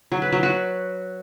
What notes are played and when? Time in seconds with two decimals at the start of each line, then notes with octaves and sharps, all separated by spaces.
0.12 F#3
0.22 B4
0.32 F#3
0.43 F#4